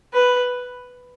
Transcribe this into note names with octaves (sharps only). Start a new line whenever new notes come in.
B4